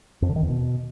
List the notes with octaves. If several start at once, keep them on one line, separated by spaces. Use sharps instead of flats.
F2
D3
D#3
E2
B2